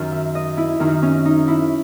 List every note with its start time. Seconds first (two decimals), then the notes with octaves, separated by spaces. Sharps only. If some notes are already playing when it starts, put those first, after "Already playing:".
Already playing: F#2 D#3
0.12 E5
0.35 D#5
0.57 E4
0.80 F#2 D#3 D#4
1.02 C#4
1.25 D#4
1.48 E4